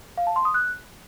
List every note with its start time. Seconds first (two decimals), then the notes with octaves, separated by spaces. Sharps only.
0.17 F5
0.27 A5
0.36 C6
0.45 D#6
0.54 F#6